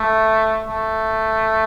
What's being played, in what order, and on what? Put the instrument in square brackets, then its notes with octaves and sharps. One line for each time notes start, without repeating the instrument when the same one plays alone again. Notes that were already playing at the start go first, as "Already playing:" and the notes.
Already playing: [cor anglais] A3
A3